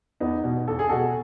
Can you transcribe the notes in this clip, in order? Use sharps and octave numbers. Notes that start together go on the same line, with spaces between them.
E2 B3 D#4
B2
E2 A4
G#4
B2 F#4 A4